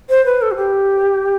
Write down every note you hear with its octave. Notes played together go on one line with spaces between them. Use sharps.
C5
B4
A4
F#4
G4